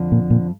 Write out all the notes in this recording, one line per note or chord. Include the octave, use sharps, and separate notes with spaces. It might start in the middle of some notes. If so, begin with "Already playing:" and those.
Already playing: F2 D3 F3
A#2
A#2